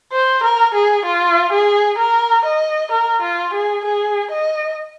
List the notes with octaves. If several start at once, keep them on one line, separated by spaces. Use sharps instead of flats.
C5
A#4
G#4
F4
G#4
A#4
D#5
A#4
F4
G#4
G#4
D#5